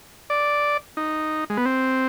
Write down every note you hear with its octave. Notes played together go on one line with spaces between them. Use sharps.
D5
D#4
G#3
B3
C4